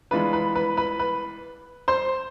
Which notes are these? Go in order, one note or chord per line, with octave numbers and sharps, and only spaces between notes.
E3 G#3 B3 D4 F4 B4 B5
B4 B5
B4 B5
B4 B5
B4 B5
C5 C6